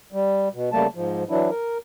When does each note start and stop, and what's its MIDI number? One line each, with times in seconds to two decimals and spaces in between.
0.12 0.49 55
0.54 0.70 47
0.72 0.87 49
0.72 0.87 55
0.72 0.87 57
0.72 0.87 58
0.72 0.87 81
0.95 1.24 44
0.95 1.24 53
1.29 1.50 52
1.29 1.50 54
1.29 1.50 62
1.29 1.50 64
1.51 1.78 70